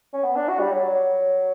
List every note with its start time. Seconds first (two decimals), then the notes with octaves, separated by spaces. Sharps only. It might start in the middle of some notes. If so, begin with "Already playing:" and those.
0.13 C#4
0.24 B3
0.36 D4
0.48 F#4
0.60 G3
0.72 F#3
0.84 F#3